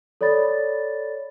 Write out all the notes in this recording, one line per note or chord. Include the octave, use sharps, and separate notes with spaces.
A4 C#5 D5 B5 A6